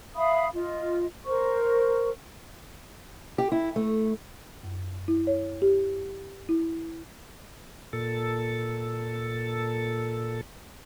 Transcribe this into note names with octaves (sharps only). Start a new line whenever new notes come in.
E5 F5 B5 D#6
F4 D#5
A#4 C5 C#6
G4
E4
A3
F#2
E4
C#5
G4
E4
A#2 A4